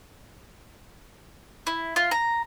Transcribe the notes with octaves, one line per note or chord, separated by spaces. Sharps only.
E4
F4
A#5